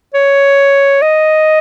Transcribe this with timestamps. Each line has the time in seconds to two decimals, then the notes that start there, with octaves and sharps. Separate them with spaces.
0.14 C#5
1.02 D#5